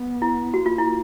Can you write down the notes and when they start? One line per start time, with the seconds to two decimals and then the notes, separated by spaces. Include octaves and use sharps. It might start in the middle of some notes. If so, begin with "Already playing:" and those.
Already playing: B3
0.22 E4
0.54 A#3 F#4
0.66 F4
0.78 E4